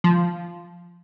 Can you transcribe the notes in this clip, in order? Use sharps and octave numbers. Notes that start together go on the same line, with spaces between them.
F3